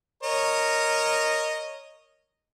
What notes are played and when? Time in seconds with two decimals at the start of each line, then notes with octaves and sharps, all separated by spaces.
0.23 A#4 C#5 D#5